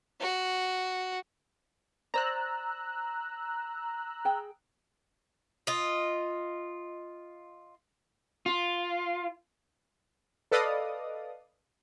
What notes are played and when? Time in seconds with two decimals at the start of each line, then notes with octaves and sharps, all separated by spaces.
0.20 F#4
2.14 C5 D5 A#5 E6 F#6
4.25 G#4 G5
5.67 F4 D#5
8.46 F4
10.52 A4 B4 D5 D#5 F5 D#6